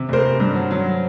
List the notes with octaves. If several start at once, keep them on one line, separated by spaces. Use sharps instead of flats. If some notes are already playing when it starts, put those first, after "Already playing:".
Already playing: C3
F1 A#4 C5
F1
G2
F#3
F#3